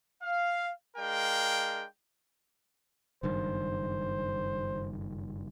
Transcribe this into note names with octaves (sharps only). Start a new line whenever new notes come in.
F5
G#3 D4 A#4 F5 G5
F#1 G2 D#3 C5